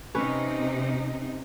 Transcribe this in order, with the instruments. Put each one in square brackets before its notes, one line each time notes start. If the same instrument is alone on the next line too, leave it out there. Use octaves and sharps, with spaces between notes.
[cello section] C3 D#4 [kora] C#4 B4 C#5